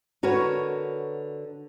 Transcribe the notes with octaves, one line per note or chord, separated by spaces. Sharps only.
D3 F#4 A#4 B4 C#5